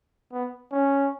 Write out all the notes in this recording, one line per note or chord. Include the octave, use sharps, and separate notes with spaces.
B3
C#4